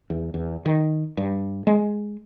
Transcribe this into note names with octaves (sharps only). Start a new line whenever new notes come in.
E2
E2
D#3
G2
G#3